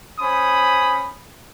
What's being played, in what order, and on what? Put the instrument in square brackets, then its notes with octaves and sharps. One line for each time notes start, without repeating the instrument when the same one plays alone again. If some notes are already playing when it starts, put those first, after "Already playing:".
[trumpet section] C#4 C5 G#5 B5 D#6